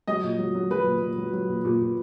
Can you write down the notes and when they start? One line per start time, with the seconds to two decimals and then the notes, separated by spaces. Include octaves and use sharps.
0.07 F#3 D#5
0.23 A#2
0.39 F#3
0.55 F#3
0.71 F#3 B4
0.86 A#2
1.02 A#2
1.18 F#3
1.33 F#3
1.48 A#2
1.65 A#2
1.81 A#2